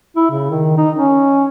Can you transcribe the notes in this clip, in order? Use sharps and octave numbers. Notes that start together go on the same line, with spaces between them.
E4
C#3
D#3
D#4
C#4